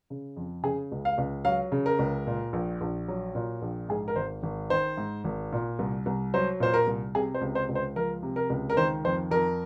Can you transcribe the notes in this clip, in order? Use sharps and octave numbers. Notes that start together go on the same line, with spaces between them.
C#3
F2
C#3 G#4
C#2
F5
C#2
F#3 F5
C#3
A#4
C#2
A#2
A#1
A#1
F#3
A#2
A#1
G#2 G#4
A#4
G#1 C5
G#1
D#3 C5
G#2
G#1
A#2
C2
C2
F#3 C5
A#2 C5
A#4
C2
C3 G#4
C5
C#2
C5
C#2
C5
F3 A#4
C3
A#4
C#2
A#4
D#3 C5
F2 C5
F2 A#4